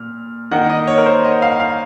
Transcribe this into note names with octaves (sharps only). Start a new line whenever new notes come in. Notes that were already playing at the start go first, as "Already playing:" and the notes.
Already playing: A#2 F6
D#3 A#3 D#4 F#5
D#5
C#5
A#4
C5
D#5
F5
F5